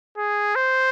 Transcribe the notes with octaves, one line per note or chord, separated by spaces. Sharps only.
G#4
C5